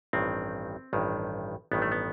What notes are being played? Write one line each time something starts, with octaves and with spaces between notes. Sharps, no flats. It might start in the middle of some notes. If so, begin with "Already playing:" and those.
A1 G2 D#3 C4
A1 G2 D#3
A1 G2 D#3 B3
A3
B3